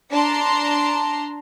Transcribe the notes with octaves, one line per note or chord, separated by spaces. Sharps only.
D4 A5 A#5 C6